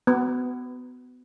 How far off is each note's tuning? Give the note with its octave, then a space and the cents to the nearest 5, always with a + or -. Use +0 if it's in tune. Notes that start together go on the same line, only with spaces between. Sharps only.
B3 +20